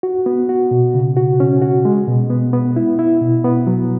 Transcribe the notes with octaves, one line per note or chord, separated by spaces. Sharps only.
F#4
B3
F#4
B2
C#3
F#4
C#4
F#4
G#3
B2
B3
B3
E4
E4
B2
B3
F#3